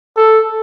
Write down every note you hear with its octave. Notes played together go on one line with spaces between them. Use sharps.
A4